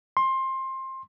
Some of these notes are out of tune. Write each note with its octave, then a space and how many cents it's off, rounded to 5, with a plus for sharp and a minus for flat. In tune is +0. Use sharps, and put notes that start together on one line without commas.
C6 +20